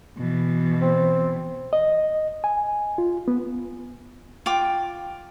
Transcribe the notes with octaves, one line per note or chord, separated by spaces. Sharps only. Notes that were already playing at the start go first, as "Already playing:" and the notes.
B2 E3
C4
D#5
G#5
F4
B3
F4 G5 D6